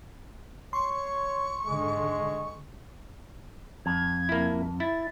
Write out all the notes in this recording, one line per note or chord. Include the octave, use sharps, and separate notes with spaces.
C#5 C6 C#6
G#2 D3 G#3
F2 G#6
A#3 E4
E4 A6